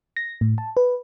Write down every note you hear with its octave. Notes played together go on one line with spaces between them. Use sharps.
A#6
A2
A5
B4